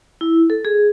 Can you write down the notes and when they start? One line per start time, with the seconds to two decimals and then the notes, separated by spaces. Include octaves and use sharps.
0.21 E4
0.50 A4
0.65 G#4